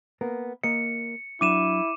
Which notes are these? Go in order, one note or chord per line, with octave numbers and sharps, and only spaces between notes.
A#3 B3 A#4
A#3 D#5 C#7
F#3 D4 E4 D6 D#7 E7